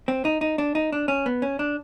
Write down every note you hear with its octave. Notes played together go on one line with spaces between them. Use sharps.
C4
D#4
D#4
D4
D#4
D4
C#4
B3
C#4
D4